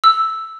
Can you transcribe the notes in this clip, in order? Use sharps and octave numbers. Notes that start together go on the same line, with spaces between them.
E6